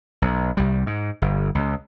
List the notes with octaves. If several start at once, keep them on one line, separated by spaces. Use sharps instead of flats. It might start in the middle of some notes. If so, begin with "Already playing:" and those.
B1
C2 G3
G#2
G1
C#2